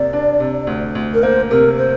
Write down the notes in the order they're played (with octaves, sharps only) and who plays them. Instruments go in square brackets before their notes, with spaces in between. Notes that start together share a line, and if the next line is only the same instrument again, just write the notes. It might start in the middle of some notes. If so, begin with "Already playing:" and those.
Already playing: [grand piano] F2 C3 A#3 [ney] D5
[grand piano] D4
C3
D2
D2
[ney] A#4
[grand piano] A#3 [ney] C5
[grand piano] C3 [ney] A#4
[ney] C5